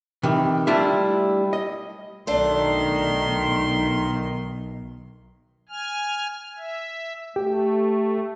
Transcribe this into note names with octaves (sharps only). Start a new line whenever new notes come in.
C3 D#3 E3
G3 A3 D4 E4 F4 E5
D#5
B1 D#3 A3 D4 C6
G#5 F6
E5
A3 G4